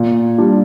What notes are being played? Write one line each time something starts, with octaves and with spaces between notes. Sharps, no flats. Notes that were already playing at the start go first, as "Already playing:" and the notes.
Already playing: A#2
G3 D4 F4